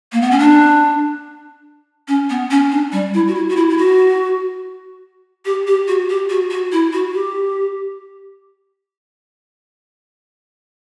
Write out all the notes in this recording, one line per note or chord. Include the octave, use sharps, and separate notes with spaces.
A#3
B3
C#4
D4
C#4
B3
C#4
D4
G3
E4
F#4
E4
F#4
E4
E4
F#4
G4
G4
F#4
G4
F#4
F#4
E4
F#4
G4